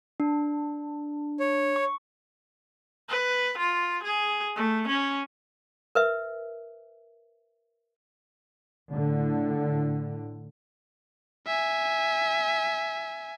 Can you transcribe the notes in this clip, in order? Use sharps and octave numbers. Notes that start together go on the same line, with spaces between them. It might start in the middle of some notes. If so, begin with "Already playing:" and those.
D4
C#5
C#6
B4
F4
G#4
A3
C#4
A#4 B4 E5
A2 D3
E5 G#5